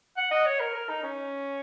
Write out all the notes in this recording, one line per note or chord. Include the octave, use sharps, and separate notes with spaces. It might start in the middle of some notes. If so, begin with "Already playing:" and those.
F#5
D#5
C#5
A#4
A#4
D#4
C#4